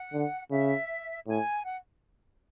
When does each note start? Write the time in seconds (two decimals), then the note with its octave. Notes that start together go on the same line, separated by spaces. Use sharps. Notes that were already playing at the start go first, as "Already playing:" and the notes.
Already playing: F#5
0.13 D3
0.51 C#3 E5
1.27 A2 G#5
1.64 F#5